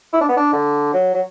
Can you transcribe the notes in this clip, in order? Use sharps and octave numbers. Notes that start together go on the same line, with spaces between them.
E4
D4
B3
D4
D3
F#3
F#3